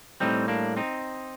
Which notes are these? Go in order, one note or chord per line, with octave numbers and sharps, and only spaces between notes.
A2 G3 C4 D#4
A#3 D4
C4 D#4